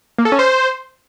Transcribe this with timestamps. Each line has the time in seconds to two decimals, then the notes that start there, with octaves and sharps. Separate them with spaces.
0.19 A#3
0.25 A4
0.32 C#4
0.39 C5